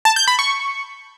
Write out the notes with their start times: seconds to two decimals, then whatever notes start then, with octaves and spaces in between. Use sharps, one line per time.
0.05 A5
0.16 G6
0.28 B5
0.39 C#6